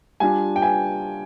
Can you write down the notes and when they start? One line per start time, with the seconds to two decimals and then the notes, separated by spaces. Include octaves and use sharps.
0.20 G3 D4 F4 G#5
0.56 G5
0.62 G#5